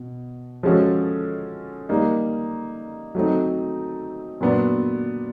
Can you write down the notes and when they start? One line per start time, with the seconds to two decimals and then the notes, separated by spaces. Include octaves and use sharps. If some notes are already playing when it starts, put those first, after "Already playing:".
Already playing: B2
0.63 F3 G#3 C#4 F#4 A4
1.89 G3 A#3 D#4
3.15 F#3 A3 C4 D#4
4.41 A#2 F#3 B3 D4